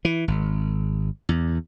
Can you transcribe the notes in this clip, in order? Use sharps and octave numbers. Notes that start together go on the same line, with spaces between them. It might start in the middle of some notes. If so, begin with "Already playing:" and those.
E3
G#1
E2